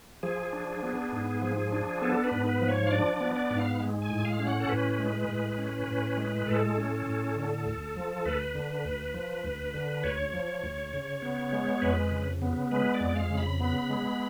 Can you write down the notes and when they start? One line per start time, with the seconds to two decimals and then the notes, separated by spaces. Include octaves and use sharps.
0.23 F3 G#4
0.53 D4
0.83 B3
1.13 G#2
1.42 F3
1.72 D4
2.02 B3 A4
2.24 B4
2.31 G#2
2.47 B4
2.61 F3
2.68 C#5
2.86 F5
2.91 D4 D5
3.13 D5
3.20 B3
3.36 D5
3.50 G#2
3.58 F5
3.80 G#3
4.02 G#5
4.10 A2
4.25 F5
4.39 C#4
4.46 F#5
4.60 A4
4.69 A2 B4
4.99 G#3
5.29 A2
5.58 C#4
5.88 A2
6.17 G#3
6.47 A2 A4
6.77 C#4
7.06 A2
7.36 D3
7.66 D2
7.96 F3
8.25 D2 B4
8.55 D3
8.85 D2
9.14 F3
9.44 D2
9.74 D3
10.04 D2 C#5
10.33 F3
10.64 D2
10.93 C#3
11.22 B3
11.53 G#3
11.82 F2 B4
12.11 C#3
12.42 B3
12.71 G#3 B4
12.94 D5
13.00 F2
13.16 F5
13.31 C#3
13.37 B5
13.60 B3 B5
13.90 G#3